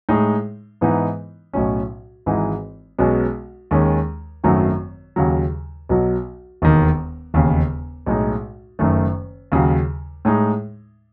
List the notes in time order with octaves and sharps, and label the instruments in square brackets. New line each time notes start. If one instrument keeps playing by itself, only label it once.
[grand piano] A2 G#3 D#4
G#2 E3 B3 D#4
B1 A2 F#3 C#4
G#1 G#2 E3 G#3 D#4
B1 B2 G#3 C#4
D#2 D#3 G#3 C#4
G#1 F#2 D#3 F#3 A3
D#2 C#3 F#3
B1 B2 F#3
E1 D#2 D#3
E1 D#2 C#3
B1 A2 G#3 D#4
F#1 F#2 D#3 A3
D#2 C#3 F#3
A2 G#3 D#4